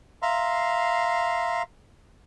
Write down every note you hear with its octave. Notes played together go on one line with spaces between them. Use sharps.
E5 F5 A#5 C6